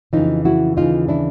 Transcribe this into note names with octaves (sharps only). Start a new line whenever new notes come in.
F2 C#3 E3 D#4 F4
E4 F#4
D#2 C#3 E3 D#4 F4
D4 E4